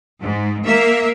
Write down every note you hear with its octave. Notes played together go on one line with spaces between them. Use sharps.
G#2
A#3 E5